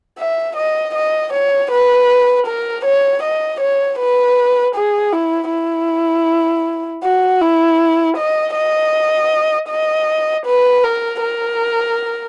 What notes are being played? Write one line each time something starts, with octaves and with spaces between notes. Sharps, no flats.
E5
D#5
D#5
C#5
B4
A#4
C#5
D#5
C#5
B4
G#4
E4
E4
F#4
E4
D#5
D#5
D#5
B4
A#4
A#4